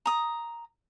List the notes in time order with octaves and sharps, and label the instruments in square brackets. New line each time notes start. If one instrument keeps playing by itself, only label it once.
[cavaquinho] A#5 D#6